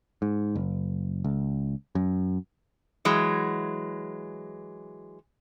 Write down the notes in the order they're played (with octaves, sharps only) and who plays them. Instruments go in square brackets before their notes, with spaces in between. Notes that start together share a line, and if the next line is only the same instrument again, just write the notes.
[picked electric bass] G#2
F#1
C#2
F#2
[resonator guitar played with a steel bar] E3 F#3 G#3